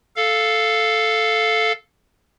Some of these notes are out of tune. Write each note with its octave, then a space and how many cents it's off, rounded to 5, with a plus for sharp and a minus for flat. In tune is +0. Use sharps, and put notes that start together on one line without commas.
A4 +0 F5 +0